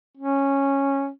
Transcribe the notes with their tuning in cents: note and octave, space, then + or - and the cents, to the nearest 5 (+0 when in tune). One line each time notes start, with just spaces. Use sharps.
C#4 -10